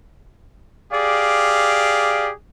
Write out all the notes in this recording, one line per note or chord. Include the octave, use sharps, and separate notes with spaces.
G4 G#4 D5 F5